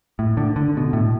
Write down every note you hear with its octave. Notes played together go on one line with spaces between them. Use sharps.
A2
D3
D3
B2
A2